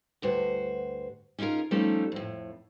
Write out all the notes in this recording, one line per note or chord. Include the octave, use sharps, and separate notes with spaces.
D2 G2 F#4 C5
C#4 D#4 F4 G#4 A#4
F3 G3 A3 C#4 D#4 A4
F2 A2